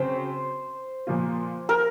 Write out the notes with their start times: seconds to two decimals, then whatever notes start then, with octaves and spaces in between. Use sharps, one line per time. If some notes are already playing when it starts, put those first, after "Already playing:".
Already playing: C#3 F#3 C4 C5
1.07 A#2 F3 A#3 F4
1.69 A#4